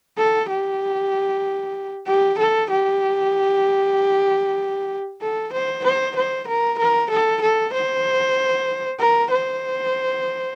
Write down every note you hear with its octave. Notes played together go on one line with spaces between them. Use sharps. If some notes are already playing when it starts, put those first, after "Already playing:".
A4
G4
G4
A4
G4
A4
C5
C5
C5
A#4
A#4
A4
A4
C5
A#4
C5